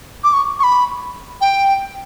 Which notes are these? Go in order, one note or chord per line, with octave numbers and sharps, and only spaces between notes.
D6
C#6
C#6
B5
G5